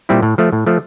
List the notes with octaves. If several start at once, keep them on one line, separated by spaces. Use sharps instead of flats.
A#2 G3 C4 E4
A2
F3 A3
A2
F3 A3